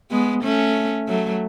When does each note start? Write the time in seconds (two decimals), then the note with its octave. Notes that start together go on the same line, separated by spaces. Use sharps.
0.11 G#3 B3
0.43 A3 C#4
1.08 F#3 A3